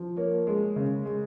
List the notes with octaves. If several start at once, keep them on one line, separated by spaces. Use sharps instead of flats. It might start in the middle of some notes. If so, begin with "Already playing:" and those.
Already playing: F3
A#3 A#4 C#5
G#3
C#3
G#3